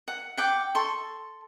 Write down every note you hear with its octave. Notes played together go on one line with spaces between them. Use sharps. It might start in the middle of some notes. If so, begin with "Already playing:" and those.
F#5
F#5 G5 D6
A4 C6 C#6